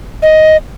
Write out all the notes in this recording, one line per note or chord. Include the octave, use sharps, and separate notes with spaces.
D#5